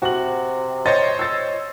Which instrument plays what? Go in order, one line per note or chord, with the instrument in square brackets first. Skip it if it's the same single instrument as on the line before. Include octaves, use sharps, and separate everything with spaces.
[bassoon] C3 [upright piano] F#4 F#7
[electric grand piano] C5 C#5 D#5 [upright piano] C6 A6
[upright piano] E6 A6